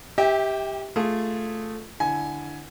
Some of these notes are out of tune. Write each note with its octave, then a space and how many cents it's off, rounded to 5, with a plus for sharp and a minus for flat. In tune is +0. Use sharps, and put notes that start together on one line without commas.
G4 +0 E5 -30 G5 +30
A3 +0 F4 +0 G#4 +0
D3 +0 E4 +0 G#5 +15